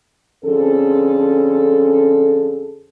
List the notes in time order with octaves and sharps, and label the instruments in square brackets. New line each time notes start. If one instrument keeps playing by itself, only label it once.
[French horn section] F2 D3 C#4 G#4 A4